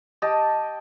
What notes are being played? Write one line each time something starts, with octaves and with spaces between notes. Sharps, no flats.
G4 D#5 A5